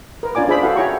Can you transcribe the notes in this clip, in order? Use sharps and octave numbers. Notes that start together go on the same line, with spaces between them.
A#4 B4
C#4 D4 F4 D5 G#5 D6
D4 F4 G#4 C5 E5 B5
E4 F#4 A4 B4 F5 F#5
E4 G#4 C#5 G5 A#5 C#6